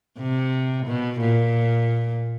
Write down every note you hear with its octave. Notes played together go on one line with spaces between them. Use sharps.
C3
B2
A#2